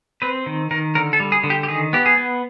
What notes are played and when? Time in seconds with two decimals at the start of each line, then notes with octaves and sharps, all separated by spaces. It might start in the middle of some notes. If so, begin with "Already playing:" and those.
0.22 C4 B4
0.46 D#3
0.71 D#3 A#4
0.95 D3 A#4
1.13 A4
1.20 G3
1.32 G#4
1.44 D3
1.50 G4
1.63 G4
1.68 D#3 G#4
1.93 B3 G4
2.06 G#4
2.18 B3